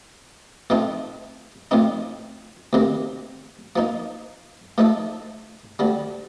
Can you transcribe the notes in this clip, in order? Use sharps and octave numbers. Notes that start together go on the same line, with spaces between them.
A2 F3 A3 C4 D#4
A2 F3 C4 D#4
D2 C3 D#3 A#3
F3 A#3 D#4
A2 F3 A3 D#4 A4
D2 D3 G3